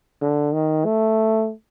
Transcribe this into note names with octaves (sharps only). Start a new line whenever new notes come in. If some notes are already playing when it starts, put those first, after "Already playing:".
D3
D#3
A3